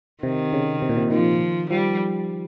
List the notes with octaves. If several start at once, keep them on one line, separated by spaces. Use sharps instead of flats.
C3 D#3
C#3
C3
A#2
C3
D#3 F3
F3 G3